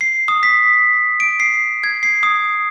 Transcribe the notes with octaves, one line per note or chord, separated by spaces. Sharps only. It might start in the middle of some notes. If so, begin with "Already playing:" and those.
C7
D#6
B6
D7
C7
G#6
C7
D#6